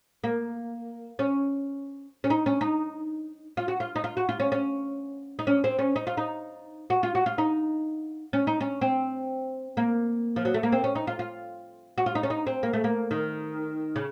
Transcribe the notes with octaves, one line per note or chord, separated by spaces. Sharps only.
A#3
C#4
C#4
D#4
C#4
D#4
F4
F#4
F4
D#4
F4
F#4
F4
C#4
C#4
D#4
C#4
C4
C#4
D#4
F4
D#4
F#4
F4
F#4
F4
D#4
C#4
D#4
C#4
C4
A#3
F3
F#3
A3
A#3
C4
C#4
D#4
F4
F4
F#4
F4
D#4
C#4
D#4
C4
A#3
A3
A#3
D#3
C#3